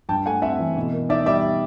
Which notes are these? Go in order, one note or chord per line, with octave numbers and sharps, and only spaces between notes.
G2 G5 A5
A3 F#5 G#5
C4 E5 F#5
E3
B2
A#3
D#4 D5 E5
G3 D5 E5